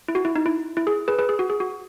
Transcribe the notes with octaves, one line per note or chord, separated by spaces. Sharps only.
E4
F#4
E4
D#4
E4
E4
G#4
G#4 B4
G#4 B4
G#4
F#4
G#4
F#4